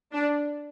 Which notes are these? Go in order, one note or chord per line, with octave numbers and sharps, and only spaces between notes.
D4